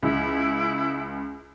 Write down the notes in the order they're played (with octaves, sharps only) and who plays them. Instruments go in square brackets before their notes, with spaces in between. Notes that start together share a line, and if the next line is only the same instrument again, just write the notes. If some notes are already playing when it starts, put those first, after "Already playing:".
[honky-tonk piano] C#2 [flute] E4